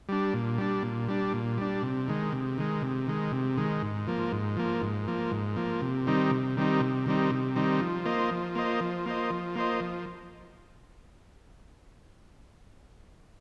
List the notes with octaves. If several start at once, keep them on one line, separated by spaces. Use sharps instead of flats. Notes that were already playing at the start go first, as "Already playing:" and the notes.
G3 D4
A#2
G3 D4
A#2
G3 D4
A#2
G3 D4
C3
D#3 G#3
C3
D#3 G#3
C3
D#3 G#3
C3
D#3 G#3
G#2
F3 A#3
G#2
F3 A#3
G#2
F3 A#3
G#2
F3 A#3
C3
D#3 G3 C4 D#4
C3
D#3 G3 C4 D#4
C3
D#3 G3 C4 D#4
C3
D#3 G3 C4 D#4
F3
A#3 F4 C5 D#5
F3
A#3 F4 C5 D#5
F3
A#3 F4 C5 D#5
F3
A#3 F4 C5 D#5
F3